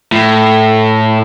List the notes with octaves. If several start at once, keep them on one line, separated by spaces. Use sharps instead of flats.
A2